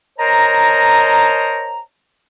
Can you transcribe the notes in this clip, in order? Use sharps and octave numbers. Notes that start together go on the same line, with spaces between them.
A#4 C5 C#5 D#5 A5 A#5